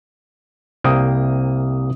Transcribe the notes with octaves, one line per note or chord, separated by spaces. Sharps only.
C2 C3 A#3 G5 D#6